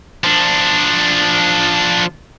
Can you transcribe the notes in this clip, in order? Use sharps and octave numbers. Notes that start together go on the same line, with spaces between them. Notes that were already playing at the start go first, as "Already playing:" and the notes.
F3 D4